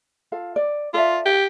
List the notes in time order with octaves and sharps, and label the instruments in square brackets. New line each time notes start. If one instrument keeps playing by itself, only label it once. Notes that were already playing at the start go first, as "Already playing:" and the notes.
[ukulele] F4 A4 F5
D5
[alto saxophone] F4 [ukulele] A4 D5 E5
[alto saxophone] G4